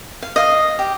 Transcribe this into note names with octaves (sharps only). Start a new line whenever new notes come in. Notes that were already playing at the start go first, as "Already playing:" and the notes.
F5
D#5 F5
G4